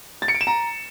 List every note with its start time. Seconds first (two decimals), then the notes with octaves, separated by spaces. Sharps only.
0.22 A6
0.28 C#7
0.35 D7
0.41 E7
0.47 A#5